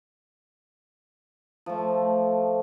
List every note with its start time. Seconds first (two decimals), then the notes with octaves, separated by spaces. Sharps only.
1.66 F3 A3